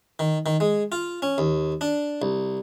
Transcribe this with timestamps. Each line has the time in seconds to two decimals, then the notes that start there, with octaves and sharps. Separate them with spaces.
0.19 D#3
0.46 D#3
0.60 G#3
0.92 F4
1.22 C#4
1.38 D#2
1.81 D4
2.22 C2